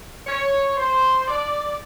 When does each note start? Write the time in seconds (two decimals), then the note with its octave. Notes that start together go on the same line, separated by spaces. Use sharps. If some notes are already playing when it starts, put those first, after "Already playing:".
0.26 C#5
0.77 C5
1.28 D5